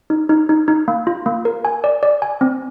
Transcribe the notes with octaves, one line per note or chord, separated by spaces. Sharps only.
D#4
D#4
D#4
D#4
A#3
F4
A#3
A#4
G#5
D5
D5
G#5
C4